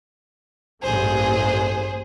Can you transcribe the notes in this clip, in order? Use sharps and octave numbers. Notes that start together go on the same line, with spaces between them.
A1 G2 A#3 G#4 C5